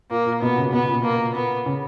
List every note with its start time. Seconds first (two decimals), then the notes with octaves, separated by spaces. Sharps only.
0.10 A#2 A#3
0.26 A#2
0.42 B2 B3
0.58 C#3
0.73 B2 B3
0.88 A#2
1.04 A#3
1.34 B3
1.66 C#3